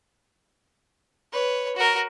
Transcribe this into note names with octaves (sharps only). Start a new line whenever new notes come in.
B4 C#5
F#4 A#4